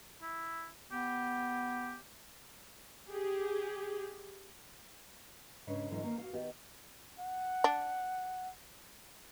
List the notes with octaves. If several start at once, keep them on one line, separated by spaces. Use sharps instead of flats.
E4
B3 G4
G4 G#4
G#2 C#3 D4 B4 C#5
G#2 B2 D3 E3 F#3
D#3 A#3 C#4
F#4 F5
D#3 B3 G4
F#5
D4